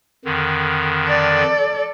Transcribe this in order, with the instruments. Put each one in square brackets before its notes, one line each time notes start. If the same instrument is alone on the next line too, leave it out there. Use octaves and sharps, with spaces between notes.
[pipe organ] F2 D3 D#3
[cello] A4 D5